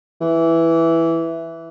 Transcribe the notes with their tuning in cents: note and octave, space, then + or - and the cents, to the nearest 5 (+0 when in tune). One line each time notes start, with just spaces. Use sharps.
E3 +0